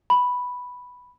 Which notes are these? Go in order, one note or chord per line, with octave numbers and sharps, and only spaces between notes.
B5